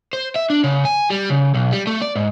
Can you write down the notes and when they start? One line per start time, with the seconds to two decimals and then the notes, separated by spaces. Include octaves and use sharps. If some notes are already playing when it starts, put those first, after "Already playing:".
0.13 C5
0.36 E5
0.50 D4
0.64 C#3
0.85 G#5
1.10 G3
1.30 C#3
1.54 B1
1.72 G3
1.87 A3
2.02 D5
2.15 G#2